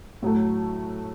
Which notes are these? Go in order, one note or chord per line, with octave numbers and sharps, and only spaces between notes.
A2 F#3 A3